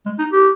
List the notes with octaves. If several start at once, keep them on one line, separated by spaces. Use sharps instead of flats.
G#3
D#4
G4